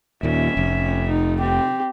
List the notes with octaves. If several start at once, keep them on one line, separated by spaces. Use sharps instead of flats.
D#2 A#2 C#4 E5
F1
D#4
C4 G4